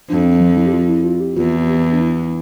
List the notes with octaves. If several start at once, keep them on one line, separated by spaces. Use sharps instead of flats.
F2 D4
C4
F3
E4
G4
F4
E4
F4
G4
E2 F4
G4
D4
E4